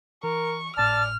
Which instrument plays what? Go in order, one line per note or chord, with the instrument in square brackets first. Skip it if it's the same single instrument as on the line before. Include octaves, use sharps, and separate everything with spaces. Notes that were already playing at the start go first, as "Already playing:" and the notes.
[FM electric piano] E3 [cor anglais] A#4 [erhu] C#6
[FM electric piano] G#1 A2 [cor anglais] D5 [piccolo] A5 [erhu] F6